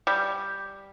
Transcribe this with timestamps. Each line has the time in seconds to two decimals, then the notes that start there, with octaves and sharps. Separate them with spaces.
0.07 G3